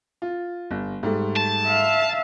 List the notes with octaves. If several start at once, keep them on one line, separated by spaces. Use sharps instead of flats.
F4
G1
G#2 G3 A3
A5
E5 F5